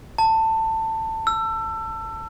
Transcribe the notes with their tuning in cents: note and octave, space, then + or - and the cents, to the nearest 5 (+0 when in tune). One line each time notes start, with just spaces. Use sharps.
A5 +20
E6 +25